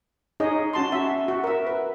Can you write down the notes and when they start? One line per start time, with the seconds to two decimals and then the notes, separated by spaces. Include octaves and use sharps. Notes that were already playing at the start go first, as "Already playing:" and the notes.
0.40 D#4 G#4 C#5 D#5
0.73 C#4 F#4 A5 C6
0.92 F#4 E5
1.28 F#4
1.44 A#4 E5
1.67 B4